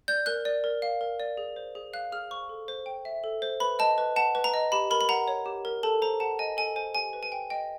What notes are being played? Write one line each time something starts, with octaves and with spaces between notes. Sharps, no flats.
D5 G6
A#4 F#6
D5
A#4
F5
A#4
D5
G#4
C5
G#4
F5 F#6
G#4 F6
C5 C#6
A4
C5
G5
E5
A4
C5
B4 B5
D#5 A5
B4
F#5 A5
B4
A#5
D#5
G4 B5
A#4 B5
B5
F#5 A#5
C#5
G4
A#4
A4 A5
C5 A#5
F#5 A5
D#5 G#5
A4 G#5
C5 G#5
G4 G#5
B4
G#5
G5
D#5 G5